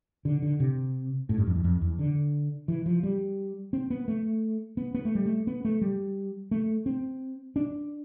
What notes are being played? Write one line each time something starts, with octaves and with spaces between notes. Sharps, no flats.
D3
D3
C3
A2
G2
F2
E2
F2
E2
D3
E3
F3
G3
C4
B3
A3
B3
B3
A3
G3
A3
B3
A3
G3
A3
C4
D4